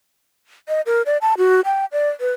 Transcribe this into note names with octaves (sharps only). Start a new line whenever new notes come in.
D#5
A#4
D5
A5
F#4
G5
D5
B4